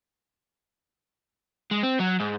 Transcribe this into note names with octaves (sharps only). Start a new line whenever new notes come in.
G#3
C4
F#3
G#2